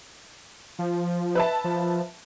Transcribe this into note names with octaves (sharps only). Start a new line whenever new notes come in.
F3
B4 E5 A5
F3